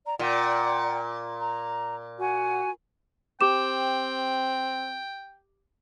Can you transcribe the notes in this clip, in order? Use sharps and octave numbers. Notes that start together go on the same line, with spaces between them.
D5 A#5
A#2 D5 F#5 G5
A#5
F#4 F#5 G#5
C4 G4 G5 D6 E7